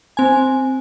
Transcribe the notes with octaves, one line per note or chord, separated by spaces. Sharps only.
C4 G#5